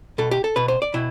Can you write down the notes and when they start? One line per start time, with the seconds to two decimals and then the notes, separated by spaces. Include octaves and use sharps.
0.18 B2 A4
0.31 G4
0.44 A4
0.56 B2 B4
0.68 C5
0.82 D5
0.94 B2 E4